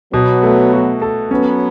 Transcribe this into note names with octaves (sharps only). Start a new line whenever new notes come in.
B2 F#3 B3
A3
F#4
A4
F#3 B3 C#4